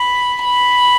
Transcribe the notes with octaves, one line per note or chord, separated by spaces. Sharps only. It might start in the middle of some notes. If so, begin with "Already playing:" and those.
Already playing: B5
B5